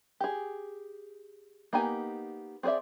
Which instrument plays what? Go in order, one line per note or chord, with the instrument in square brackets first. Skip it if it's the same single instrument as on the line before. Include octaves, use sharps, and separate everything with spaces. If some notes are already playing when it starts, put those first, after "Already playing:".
[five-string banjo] G4 G#4
A#3 B3 D#4 G4 G#5
C4 G#4 B4 D5 E5